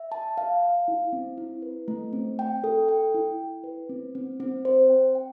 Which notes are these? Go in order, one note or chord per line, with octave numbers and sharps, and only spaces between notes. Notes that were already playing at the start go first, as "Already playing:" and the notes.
Already playing: E5
A5
F5
F5
E4
C4
E4
B4
A3
C4
G5
A4
G5
E4
E4
B4
C4
C4
C4
C5
G5
G5